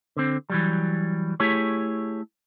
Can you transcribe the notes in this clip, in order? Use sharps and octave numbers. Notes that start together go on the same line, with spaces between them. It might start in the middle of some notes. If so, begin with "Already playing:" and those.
D3 C4
E3 F#3 G3
A3 E4 G4 G#4 C#5